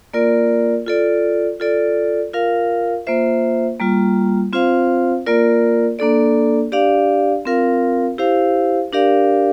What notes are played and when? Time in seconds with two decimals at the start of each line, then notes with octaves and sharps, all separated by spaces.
0.14 A#3 F4 A#4 D5
0.86 F4 A4 D5
1.60 F4 A4 D5
2.33 F4 A#4 F5
3.07 A#3 F4 C5 E5
3.80 G3 A#3 F4
4.53 C4 F4 C5 F5
5.26 A#3 F4 A#4 D5
5.99 A#3 D4 A4 D5
6.72 D4 G4 D5 F5
7.46 C4 F4 A#4 F5
8.18 E4 G4 C5 F5
8.92 D4 G4 A#4 D5 F5